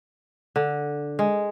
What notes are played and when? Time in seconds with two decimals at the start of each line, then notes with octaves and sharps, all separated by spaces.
0.56 D3
1.19 G#3